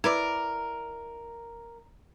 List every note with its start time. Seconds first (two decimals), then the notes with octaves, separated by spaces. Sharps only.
0.04 E4 A#4 B4 D5